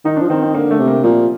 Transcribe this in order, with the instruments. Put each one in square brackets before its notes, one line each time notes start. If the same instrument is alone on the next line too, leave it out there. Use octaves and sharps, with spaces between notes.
[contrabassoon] D#3 [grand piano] D#4
[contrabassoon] F3 [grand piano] D4
[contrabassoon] D#3 [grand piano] C4
[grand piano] C4
[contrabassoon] D3 [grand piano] A#3
[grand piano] A3
[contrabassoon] C3
[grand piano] A#3
[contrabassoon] A#2 [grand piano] F3